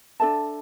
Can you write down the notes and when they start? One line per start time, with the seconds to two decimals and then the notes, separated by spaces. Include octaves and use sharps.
0.20 D4 A4 E5 A5